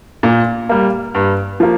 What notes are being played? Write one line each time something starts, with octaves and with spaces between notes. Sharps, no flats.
A#2
G3 A#3
G2
F3 A#3